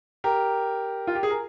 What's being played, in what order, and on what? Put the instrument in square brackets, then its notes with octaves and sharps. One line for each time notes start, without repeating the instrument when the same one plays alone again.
[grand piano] G4 A#4
F4
G4
G#4
A#4